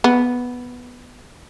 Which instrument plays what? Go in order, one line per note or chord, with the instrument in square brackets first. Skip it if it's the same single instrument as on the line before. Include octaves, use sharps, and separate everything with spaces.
[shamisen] B3